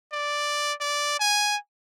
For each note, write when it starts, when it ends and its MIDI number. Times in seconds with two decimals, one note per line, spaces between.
0.13 0.73 74
0.81 1.16 74
1.20 1.57 80